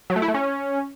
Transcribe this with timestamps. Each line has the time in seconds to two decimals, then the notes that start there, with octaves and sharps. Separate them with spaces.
0.10 F#3
0.16 A3
0.22 E4
0.28 A3
0.34 C#4